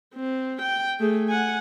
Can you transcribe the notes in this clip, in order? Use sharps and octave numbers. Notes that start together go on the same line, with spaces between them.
C4
G5
A3 G#4
F#5 G#5